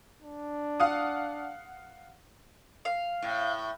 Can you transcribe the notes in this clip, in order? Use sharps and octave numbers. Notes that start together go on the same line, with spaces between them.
D4
F5 F#5 D#6
F5
A2